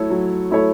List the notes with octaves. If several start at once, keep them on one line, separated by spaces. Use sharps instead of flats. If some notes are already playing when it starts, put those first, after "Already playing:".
Already playing: F#3 A3 E4 A4 C#5
F#3
A3 E4 A4 C#5